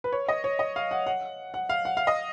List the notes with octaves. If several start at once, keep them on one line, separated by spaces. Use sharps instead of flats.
B4
C#5
D#5
C#5
D#5
F5
F#5
F#5
F#5
F5
F#5
F5
D#5